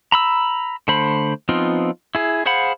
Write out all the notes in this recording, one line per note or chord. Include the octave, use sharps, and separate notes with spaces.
A#5 B5 E6
D3 A3 C5 B5
F3 B3 C4 D#4 F4
E4 G#4
G#4 C5 F5 F#5 B5